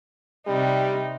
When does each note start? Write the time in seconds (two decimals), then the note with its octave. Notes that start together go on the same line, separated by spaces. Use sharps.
0.47 C3 G3 D#4